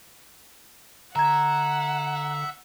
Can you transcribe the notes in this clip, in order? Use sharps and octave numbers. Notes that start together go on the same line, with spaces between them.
D3 E5 F#5 A#5 G#6